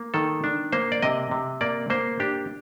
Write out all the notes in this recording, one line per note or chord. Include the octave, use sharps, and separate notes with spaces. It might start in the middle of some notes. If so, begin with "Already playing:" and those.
Already playing: A#3
D#3 A4
D4
A#3 C5
D5
C3 D#5
C3
A#3 D5
A#3 C5
D4 G4